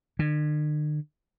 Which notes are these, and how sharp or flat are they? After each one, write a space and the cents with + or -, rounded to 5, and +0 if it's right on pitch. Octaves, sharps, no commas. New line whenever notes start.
D3 +45